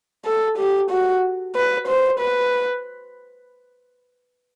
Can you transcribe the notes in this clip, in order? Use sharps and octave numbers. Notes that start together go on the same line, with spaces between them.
A4
G4
F#4
B4
C5
B4